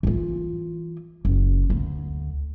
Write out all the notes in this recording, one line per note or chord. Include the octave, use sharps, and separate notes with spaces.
E3 F4
F#1
D2